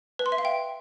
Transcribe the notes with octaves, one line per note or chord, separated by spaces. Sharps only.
B4
C6
E5
F5
G5